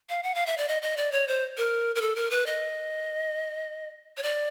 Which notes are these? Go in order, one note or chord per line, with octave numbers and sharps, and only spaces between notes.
F5
F#5
F5
E5
D5
D#5
D#5
D5
C#5
C5
A#4
A#4
A4
A#4
B4
D#5
C#5
D5